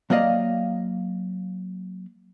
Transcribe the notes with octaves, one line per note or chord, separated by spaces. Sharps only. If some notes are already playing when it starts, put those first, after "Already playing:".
F#3 A#3 D5 D#5 F5